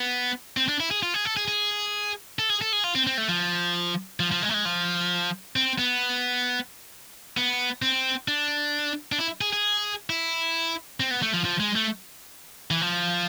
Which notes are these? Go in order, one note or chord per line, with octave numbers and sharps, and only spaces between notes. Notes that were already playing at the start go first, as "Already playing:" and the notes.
Already playing: B3
C4
D4
E4
G#4
F4
G#4
A4
G#4
G#4
A4
G#4
A4
G#4
F4
C4
C4
A3
F3
F3
F3
G#3
A3
G#3
F3
C4
B3
B3
C4
D4
D4
E4
G#4
G#4
E4
C4
B3
A3
F3
F3
G#3
A3
E3
F3